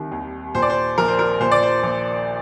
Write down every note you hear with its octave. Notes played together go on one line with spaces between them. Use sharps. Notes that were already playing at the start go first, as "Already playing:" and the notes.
Already playing: C2 D#3
D#2
A#2 C5
D5
C5
A#1 A#4
C5
A#4
A#2 C5
D5
C5
A#1